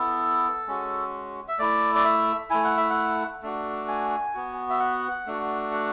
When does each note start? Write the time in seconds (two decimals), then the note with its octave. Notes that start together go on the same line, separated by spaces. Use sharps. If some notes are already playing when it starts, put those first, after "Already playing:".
Already playing: B3 E4 A4
0.67 G#3 C#4 F#4
1.48 E5
1.59 A3 E4 D5
1.95 D5
2.05 E5
2.50 A3 E4 G#5
2.64 F#5
2.77 E5
2.90 F#5
3.42 A3 D4 F#4
3.88 G#5
4.34 B3 F#4
4.70 E5
4.80 F#5
5.26 A3 D4 F#4
5.72 F#5